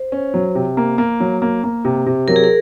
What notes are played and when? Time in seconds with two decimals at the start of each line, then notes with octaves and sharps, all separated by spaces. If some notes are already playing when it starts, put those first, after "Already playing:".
Already playing: C5
0.12 C#4
0.34 F#3
0.55 C3
0.77 A#3
0.98 A#3
1.20 F#3
1.42 A#3
1.64 A#3
1.85 C3
2.06 C3
2.28 F#3 A#4
2.36 G#4
2.44 A#4